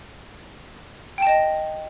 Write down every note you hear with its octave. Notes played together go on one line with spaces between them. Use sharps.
D#5 G5 A5